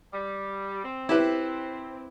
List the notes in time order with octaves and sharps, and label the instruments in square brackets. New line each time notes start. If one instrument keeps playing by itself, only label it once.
[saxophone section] G3
C4
[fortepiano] E4 G4 B4